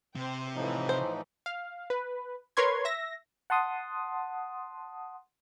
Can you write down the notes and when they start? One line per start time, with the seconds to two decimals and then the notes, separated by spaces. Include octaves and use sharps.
0.16 C3 C5 G5
0.55 A2 E3 F3 A3 D#4
0.89 C5
1.46 F5
1.90 B4
2.57 A#4 B4 C#5 C6 G#6
2.85 E5 A#6
3.50 F#5 A5 C6 D#6